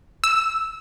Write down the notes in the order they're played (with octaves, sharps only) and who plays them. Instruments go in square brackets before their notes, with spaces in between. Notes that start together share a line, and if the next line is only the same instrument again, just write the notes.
[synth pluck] E6